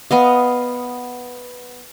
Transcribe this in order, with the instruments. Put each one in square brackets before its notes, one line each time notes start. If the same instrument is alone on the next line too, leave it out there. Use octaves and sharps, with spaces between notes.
[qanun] B3 D#5 F5